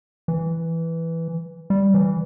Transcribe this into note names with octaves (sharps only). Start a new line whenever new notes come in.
E3
G3
E3